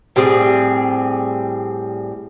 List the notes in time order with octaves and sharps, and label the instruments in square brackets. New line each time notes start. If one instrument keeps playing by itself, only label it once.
[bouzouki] A2 G3 C4 G#4